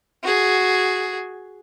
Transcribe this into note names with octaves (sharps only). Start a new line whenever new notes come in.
F#4 G#4